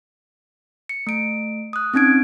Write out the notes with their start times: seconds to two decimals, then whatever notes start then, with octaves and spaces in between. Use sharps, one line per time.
0.89 C#7
1.07 A3 D7
1.73 D#6 F#6
1.94 C4 C#4 D#4 G#6 D7